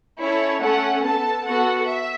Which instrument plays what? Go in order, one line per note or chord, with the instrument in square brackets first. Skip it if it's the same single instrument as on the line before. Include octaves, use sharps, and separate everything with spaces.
[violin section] C#4 E4 A4 C#5
A3 C#4 A4 F#5
B3 A4 A5
B3 F#4 A4 F#5
E5